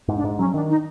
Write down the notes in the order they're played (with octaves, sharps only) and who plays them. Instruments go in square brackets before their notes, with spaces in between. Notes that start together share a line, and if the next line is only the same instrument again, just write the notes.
[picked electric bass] G#2
[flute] D4
[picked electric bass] G#2
[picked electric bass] F#3 [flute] C#4
[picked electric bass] D#3 [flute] D4
[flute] D#4